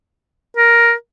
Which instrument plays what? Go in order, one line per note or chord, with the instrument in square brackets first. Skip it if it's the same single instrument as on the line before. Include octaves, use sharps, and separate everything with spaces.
[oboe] A#4